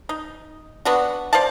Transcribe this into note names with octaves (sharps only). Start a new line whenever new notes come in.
D#4
B3 D4 F#4
C5 D5 F5 A5